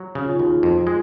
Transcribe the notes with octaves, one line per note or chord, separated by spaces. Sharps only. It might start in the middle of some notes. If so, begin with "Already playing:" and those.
Already playing: F#3
C#3 F#4
F4
D#4 F#4
D#2 F4 G#4
F2
F4
G#3